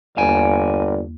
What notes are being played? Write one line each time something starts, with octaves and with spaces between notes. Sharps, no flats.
G1 E2 A#3 D5 F5 G#5